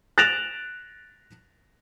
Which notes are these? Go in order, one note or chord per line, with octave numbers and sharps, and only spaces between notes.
F#6 A6 A#6 D7 E7 F7